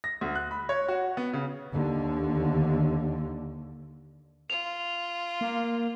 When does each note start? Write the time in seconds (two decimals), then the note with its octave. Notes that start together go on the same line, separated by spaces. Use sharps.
0.04 A#6
0.21 D2
0.35 F#6
0.51 B5
0.69 C#5
0.88 F#4
1.17 B3
1.33 C#3
1.73 D#2 D3
4.50 F4 F7
5.41 A#3